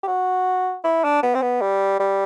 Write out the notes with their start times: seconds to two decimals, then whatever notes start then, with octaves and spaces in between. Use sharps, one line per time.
0.03 G4
0.07 F#4
0.84 E4
1.04 D4
1.23 B3
1.35 C4
1.42 B3
1.62 G3
1.99 G3